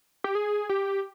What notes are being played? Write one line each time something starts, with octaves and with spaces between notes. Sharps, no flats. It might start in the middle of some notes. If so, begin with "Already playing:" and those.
G4
G#4
G4